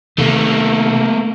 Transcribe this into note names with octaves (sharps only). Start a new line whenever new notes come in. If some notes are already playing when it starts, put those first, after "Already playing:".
C3 D#3 A3 A#3